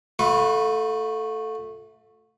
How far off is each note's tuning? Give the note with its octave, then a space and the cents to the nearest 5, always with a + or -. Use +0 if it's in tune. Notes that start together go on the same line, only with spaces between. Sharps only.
A3 +0 F4 +45 B4 +0